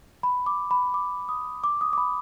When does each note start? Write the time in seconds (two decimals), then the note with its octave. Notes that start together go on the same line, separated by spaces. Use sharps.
0.23 B5
0.46 D6
0.71 B5
0.94 D6
1.29 D#6
1.64 D6
1.81 D#6
1.93 D6
1.98 B5